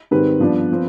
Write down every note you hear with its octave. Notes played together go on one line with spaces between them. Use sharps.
G#2 D#3 G3 C4 B4
G2 F3 B3 D4
F3 C4